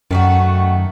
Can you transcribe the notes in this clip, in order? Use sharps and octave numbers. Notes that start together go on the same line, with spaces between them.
F#2 D#3 A3 F#4